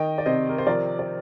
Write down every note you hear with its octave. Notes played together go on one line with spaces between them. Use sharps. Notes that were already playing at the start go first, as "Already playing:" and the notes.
Already playing: D#3 D#5 G5
D5
C3 C5 D#5
A#4
C5
F3 A#4 D5
D5